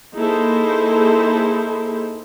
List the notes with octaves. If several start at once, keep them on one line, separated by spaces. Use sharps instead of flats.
A#3 D#4 E4 G#4 A4 C5